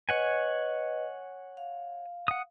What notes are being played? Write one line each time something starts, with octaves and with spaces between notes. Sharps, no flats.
B4 C#5 D#5 F#5 G#5
F5
F#5 D#6